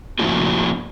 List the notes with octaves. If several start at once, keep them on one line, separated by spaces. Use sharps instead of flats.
F3 A3 A#3 D4 E4 F#4